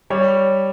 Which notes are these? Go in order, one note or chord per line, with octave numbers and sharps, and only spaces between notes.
G3 C#5